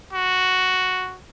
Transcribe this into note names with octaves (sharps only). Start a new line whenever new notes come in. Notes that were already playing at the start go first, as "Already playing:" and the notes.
F#4